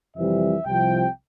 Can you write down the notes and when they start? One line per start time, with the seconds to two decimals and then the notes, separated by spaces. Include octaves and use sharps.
0.16 F2 C3 E3 G3 E5
0.65 C2 C3 F3 G5